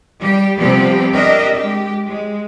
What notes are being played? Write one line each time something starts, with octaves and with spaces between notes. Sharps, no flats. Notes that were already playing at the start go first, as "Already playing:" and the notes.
G3 G4
C3 F3 G3 B3 C4 G4
D4 G4 A#4 D#5 E5
G#3 G4
G#3